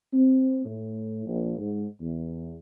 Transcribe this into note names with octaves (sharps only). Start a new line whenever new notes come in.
C4
A2
A#1
G#2
E2